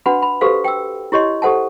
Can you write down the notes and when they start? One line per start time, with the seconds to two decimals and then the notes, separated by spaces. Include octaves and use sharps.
0.06 D4 F#4 B4 F#5 B5
0.22 B5
0.41 F#4 G4 A4 B4 C5 F5
0.64 G5 E6
1.12 E4 G4 C#5 D#5 C6
1.42 G4 A4 C5 F#5 A5